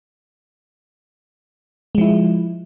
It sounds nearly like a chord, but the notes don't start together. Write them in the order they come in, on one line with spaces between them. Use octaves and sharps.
G#3 F3 E4